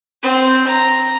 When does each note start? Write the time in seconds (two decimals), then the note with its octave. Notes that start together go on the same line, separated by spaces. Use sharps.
0.23 C4
0.67 A#5